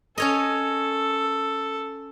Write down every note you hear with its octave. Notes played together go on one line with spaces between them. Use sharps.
C#4 A4 C#5 D#5